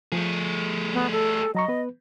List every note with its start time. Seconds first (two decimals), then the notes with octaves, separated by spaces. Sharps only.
0.12 F3 A3 G#4
0.94 B3
1.12 A4
1.55 F#3 D#5 A#5 C#6
1.68 B3 B4